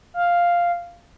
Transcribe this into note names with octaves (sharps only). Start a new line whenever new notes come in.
F5